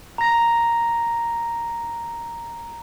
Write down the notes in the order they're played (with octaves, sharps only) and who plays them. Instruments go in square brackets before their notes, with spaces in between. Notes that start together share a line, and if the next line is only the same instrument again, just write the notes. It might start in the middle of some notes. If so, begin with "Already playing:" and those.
[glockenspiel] A#5 A#6